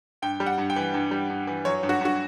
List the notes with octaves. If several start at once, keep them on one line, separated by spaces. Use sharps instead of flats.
G2 G5
G3
F#5
G2
G5
E3
G2
G3
G2
E3
F#3 C#5
G2
F#4
G2 F#4